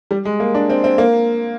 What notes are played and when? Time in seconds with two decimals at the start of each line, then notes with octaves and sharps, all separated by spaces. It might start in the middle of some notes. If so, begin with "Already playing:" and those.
0.11 G3
0.25 G#3
0.40 A#3
0.54 D4
0.70 C4
0.84 C4
0.98 A#3